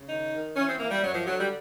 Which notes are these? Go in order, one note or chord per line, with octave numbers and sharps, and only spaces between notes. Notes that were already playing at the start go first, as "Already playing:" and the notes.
Already playing: C#3
D#3 D#4
D#3
E3 C#4
C4
E3 A#3
G3
F#2 F#3
F3
D3 F#3
G3